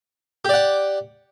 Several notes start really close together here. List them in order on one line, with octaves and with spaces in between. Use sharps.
G4 D5 F#5